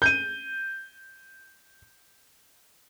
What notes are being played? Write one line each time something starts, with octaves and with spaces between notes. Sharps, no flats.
G6 D#7